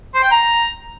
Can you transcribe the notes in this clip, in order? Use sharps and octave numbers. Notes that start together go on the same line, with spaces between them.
C5
G5
A#5